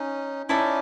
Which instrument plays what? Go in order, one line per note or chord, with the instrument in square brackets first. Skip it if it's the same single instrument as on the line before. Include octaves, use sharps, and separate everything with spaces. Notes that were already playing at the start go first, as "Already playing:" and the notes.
Already playing: [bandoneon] C#4 D#4
[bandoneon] C#4 D#4 [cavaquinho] E4 A4 D5